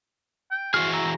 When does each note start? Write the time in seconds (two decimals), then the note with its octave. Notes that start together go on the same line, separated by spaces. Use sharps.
0.51 G5
0.74 E3 F#4 G#4 C5 F6
0.94 A#5 E6